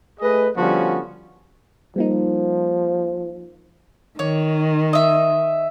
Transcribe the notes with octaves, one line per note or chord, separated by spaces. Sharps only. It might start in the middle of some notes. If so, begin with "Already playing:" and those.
A3 G#4 B4 D#5
D3 F3 G3 B3 C#4 F#4
F3 G3 A#3 D#4
D#3 C#5
D#5 E5